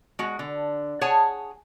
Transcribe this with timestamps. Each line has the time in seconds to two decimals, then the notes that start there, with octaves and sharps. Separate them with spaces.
0.19 G#3 F#4
0.39 D3
1.01 G#4 C#5 F#5 G#5 A5